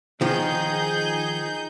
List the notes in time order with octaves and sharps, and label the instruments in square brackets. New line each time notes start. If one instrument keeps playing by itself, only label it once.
[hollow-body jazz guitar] D#3 F3 [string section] D#4 G#4 G6